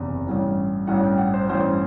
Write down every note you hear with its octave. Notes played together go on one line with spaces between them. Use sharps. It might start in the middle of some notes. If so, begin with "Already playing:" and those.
Already playing: F#1 E2 C3
A1 G2 E3
A1 G2 E3 F#5
G5
F#5
C5
A1 G2 E3 C5